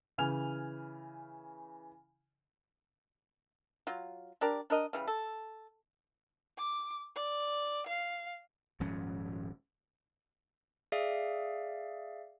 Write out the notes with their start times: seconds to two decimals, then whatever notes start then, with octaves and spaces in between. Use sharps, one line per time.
0.18 C#3 E3 G#5 F6 F7
3.87 F#3 F4
4.41 D4 G4 A#4 D5
4.70 D4 A#4 D#5
4.93 C#3 E3 G3
5.07 A4
6.58 D6
7.16 D5
7.87 F5
8.80 D#1 G#2 F3 C#4
10.92 G#4 D5 E5 F5